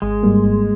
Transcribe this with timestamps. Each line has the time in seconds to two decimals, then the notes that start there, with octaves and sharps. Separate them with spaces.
0.02 G#1 G#3
0.23 G#2 G3 A#3
0.44 G#1